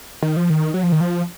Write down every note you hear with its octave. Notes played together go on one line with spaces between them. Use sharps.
D#3
F3
D#3
F#3
F3
D#3
F3